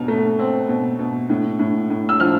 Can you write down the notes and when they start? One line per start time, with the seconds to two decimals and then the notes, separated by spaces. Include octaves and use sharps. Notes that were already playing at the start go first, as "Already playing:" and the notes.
Already playing: B2 F6
0.08 A3
0.39 C4
0.69 B2
0.99 B2
1.30 A2
1.59 A2
1.90 A2
2.09 E6
2.20 F3 F6